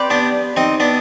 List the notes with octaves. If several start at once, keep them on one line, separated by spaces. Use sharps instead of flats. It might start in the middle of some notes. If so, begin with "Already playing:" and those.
Already playing: C4 G4 B4 D5
B3 D4
C4 D#4
B3 D4